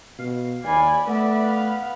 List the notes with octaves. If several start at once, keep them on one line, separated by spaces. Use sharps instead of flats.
B2 F5
D#2 D5 G#5 B5
A3 B3 B4 D5 E5
F5